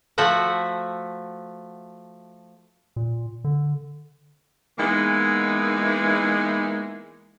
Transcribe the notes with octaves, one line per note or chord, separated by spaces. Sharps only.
F3 A3 F#4 E5 F#5
A#2
D3
E3 G#3 A#3 B3 D#4 E4